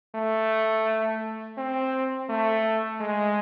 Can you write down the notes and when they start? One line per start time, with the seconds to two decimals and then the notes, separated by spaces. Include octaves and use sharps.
0.15 A3
1.58 C4
2.29 A3
3.01 G#3